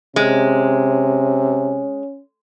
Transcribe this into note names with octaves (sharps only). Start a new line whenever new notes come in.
C3 G#3 C#4